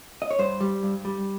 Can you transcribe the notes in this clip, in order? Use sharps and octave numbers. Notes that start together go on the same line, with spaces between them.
D#5
C#5
G2 C5
G3
G2
G3